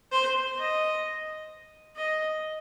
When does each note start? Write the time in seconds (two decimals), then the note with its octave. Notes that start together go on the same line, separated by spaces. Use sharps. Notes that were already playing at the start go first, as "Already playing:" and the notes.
0.12 C5
0.58 D#5
1.96 D#5